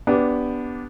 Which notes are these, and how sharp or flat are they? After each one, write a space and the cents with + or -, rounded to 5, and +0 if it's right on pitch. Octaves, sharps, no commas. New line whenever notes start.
B3 +0 D4 -10 G4 +0